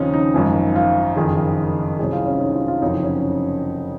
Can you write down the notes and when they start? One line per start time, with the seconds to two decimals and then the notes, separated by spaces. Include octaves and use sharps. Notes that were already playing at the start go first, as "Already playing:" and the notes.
Already playing: D#2 C#3 F3 C4 C#4 D#4
0.14 D#4
0.34 G#1 F#2 F3
0.76 F4
1.16 F#1 F2 D#3 G#4
1.99 C2 C3 F#3 G#4
2.13 F4
2.26 C#4
2.40 D#4
2.54 F4
2.68 F4
2.82 F#1 F2 C3 F#3 D#4
3.03 C#4